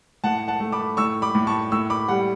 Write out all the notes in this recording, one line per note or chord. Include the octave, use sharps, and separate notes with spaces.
A2 F#5 A5
F#5 A5
A3
B5 D6
A2 C#6 E6
B5 D6
A2
A5 C#6
A2 C#6 E6
B5 D6
G3 F#5